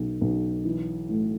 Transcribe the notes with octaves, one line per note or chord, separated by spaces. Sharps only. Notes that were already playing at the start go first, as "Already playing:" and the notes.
Already playing: B1
B1
E3
A2